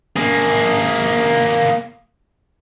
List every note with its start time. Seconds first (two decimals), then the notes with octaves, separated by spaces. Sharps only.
0.16 A#3 G#4